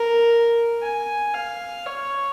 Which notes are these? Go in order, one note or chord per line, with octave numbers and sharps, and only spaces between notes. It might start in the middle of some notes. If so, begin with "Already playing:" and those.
Already playing: A#4
G#5
F5
C#5